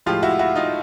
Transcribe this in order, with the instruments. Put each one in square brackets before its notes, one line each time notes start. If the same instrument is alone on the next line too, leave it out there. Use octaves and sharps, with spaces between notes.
[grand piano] A2 F3 G#3 F4 G4
E4 F#4
E4 F#4
D#4 F4